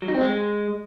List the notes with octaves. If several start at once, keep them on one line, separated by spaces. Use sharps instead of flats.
F#3
D#4
C4
G#3